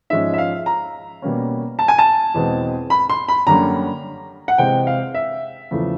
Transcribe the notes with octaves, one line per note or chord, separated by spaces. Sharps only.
G#2 F3 G#3 C#4 E5
E5
F5
A#5
B2 G3 A#3 C#4
A5
G#5
A5
E2 B2 G#3 C4
B5
C6
B5
F#2 D3 G3 A#3 C#4 A#5
F#5
C3 E3 G#3 C4 G5
F5
E5
E2 C#3 F3 A3